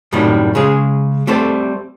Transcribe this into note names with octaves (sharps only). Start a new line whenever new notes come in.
F#2 A2 C3 D#3 G3
C#3 G#3 G#4
G3 A3 C4 A4 C5